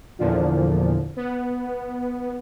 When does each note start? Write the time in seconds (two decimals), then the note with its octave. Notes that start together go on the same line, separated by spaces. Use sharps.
0.19 E2 A#2 D3 F3
1.16 B3